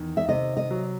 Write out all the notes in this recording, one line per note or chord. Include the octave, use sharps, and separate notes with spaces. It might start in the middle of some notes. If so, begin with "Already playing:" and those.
Already playing: E2 D#3
E5
C3 D#5
D#5
F#3